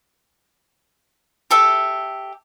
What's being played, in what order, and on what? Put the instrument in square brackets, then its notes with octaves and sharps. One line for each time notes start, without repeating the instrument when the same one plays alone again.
[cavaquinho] G4 A4 E5